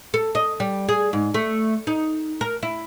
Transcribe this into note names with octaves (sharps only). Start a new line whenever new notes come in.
A4
D#5
G3
G#4
G#2
A3
D#4
A#4
E4